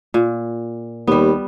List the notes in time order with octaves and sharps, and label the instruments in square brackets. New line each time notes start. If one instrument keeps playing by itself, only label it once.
[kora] A#2
[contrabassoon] D#2 [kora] G3 B3